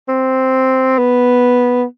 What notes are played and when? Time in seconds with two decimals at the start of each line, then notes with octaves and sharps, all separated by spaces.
0.09 C4
0.99 B3